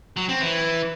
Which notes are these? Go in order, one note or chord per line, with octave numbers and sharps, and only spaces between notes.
F#3
C4
E3